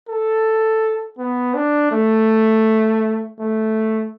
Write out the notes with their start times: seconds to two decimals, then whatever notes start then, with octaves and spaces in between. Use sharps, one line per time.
0.08 A4
1.18 B3
1.54 D4
1.91 A3
3.39 A3